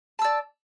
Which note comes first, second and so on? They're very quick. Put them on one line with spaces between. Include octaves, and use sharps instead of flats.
A5 E6 D5